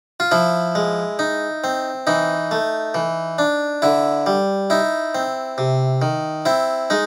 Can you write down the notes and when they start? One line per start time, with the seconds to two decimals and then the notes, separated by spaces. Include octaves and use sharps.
0.20 F4
0.31 F3 E4
0.75 G#3
1.19 D#4
1.64 C4
2.07 E3 D#4
2.51 A3
2.94 E3
3.38 D4
3.82 D3 E4
4.26 G3
4.70 D#4 E4
5.15 C4
5.58 C3
6.02 D#3
6.46 C4 E4
6.90 G#3 D#4